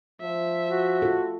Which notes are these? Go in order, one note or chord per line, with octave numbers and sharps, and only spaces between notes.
F3 E5
F#4
F4 A4